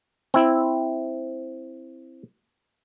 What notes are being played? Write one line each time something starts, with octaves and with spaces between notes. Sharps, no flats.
C4 E4